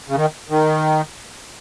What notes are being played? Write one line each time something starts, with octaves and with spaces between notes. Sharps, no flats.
C#3
D#3
D#3